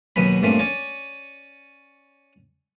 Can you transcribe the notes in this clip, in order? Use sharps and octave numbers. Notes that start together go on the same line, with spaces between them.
D#2 B2 F#3 B3 C#4 B5
G2 A#2 A3 C4 C#4
C#4 C#5 D5